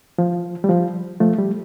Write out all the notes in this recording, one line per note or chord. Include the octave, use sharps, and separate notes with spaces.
F3
G3
F3
F3 A3
G3